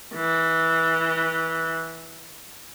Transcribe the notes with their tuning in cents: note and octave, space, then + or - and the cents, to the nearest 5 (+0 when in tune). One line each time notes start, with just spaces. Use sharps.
E3 -15